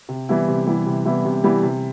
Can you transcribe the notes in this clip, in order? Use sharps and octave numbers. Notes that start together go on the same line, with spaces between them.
C3
E3 G3 B3 E4
C3
E3 G3 B3 E4
C3
E3 G3 B3 E4
C3
E3 G3 B3 E4
C3